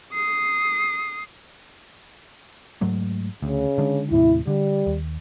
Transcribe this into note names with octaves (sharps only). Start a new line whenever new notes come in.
D#6 C7
G#2 F#3 A3
D2 C#3
D3 G#3 D4
D#2 A2 C3 E4
D3 G3
D#2